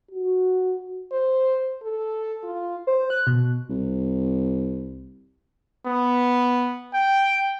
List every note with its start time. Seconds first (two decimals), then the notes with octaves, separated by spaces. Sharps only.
0.11 F#4
1.11 C5
1.83 A4
2.44 F4
2.87 C5
3.10 F#6
3.27 B2
3.70 C2
5.87 B3
6.94 G5